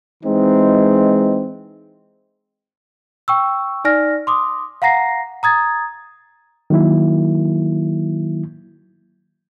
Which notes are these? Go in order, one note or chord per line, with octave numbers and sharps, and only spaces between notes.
E3 G#3 C4 D#4
G5 C#6 E6
D#4 D5 G#5 F6 A#6
C6 D6 D#6
F5 F#5 A#5 A#6 C7
A#5 D#6 G#6 A6
D#3 F#3 A#3 E4